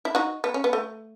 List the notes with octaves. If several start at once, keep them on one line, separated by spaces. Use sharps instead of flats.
E4
D#4 F#4
B3
C#4
B3
A3